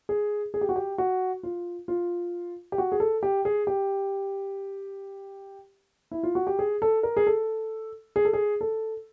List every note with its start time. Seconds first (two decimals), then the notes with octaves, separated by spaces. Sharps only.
0.09 G#4
0.54 G#4
0.61 G4
0.69 F#4
0.76 G4
0.98 F#4
1.43 F4
1.88 F4
2.72 G4
2.78 F#4
2.92 G#4
3.00 A4
3.23 G4
3.45 G#4
3.67 G4
6.11 E4
6.23 F4
6.35 F#4
6.47 G4
6.59 G#4
6.82 A4
7.03 A#4
7.17 G#4
7.27 A4
8.16 G#4
8.25 A4
8.33 G#4
8.61 A4